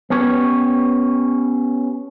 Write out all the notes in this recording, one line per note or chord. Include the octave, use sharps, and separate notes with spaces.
B3 C#4 G4 C#5